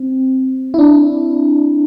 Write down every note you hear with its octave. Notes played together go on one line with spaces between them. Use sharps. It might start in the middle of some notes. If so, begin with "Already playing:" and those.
Already playing: C4
E4
D4